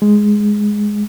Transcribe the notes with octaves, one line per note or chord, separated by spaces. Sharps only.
G#3